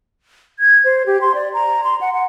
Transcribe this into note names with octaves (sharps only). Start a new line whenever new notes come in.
G#6
C5
G4
C6
D5
A#5
C6
F#5
F#5